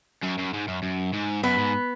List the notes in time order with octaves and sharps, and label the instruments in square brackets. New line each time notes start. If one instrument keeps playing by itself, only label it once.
[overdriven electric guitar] F#2
F#2
G#2
F#2
F#2
G#2
[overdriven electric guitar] F#2 [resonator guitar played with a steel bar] B3
[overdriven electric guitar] G#2